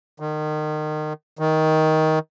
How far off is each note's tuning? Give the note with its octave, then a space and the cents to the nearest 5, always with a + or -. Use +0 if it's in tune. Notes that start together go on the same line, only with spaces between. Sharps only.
D#3 -30
D#3 +15